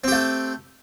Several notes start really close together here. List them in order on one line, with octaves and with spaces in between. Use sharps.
C4 G4 A3